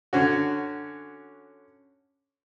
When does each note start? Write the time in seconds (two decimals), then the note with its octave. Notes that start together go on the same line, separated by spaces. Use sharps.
0.13 D3 C#4 F#4